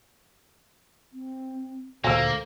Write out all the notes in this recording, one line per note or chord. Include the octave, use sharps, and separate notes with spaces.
C4
D2 A#2 A#3 A4 C5 F5 G#5